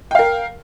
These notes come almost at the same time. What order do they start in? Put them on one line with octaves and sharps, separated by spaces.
G5 F5 A#4